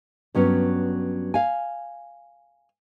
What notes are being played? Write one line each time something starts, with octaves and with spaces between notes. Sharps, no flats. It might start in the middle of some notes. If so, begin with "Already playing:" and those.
G2 F#3 B3 C#4
F5 G#5